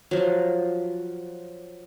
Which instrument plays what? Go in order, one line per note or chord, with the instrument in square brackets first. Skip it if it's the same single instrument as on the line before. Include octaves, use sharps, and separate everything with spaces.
[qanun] F3 F#3